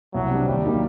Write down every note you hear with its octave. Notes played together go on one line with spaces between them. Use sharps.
C2 F#3
C3 G3 D4
D#2 G3
D#3 F#3 A#3